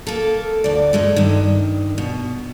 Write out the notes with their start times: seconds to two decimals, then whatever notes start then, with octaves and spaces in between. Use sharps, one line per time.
0.07 A#3 A4
0.64 D2 D5
0.93 E2 G2 G#3 A3
1.16 G2 D#3
1.98 B2